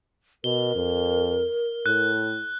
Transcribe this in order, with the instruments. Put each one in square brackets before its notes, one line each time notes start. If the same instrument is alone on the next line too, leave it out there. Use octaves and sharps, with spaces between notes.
[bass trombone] B2 [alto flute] A#4 [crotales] G7
[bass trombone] F2
[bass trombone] A2 [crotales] F#6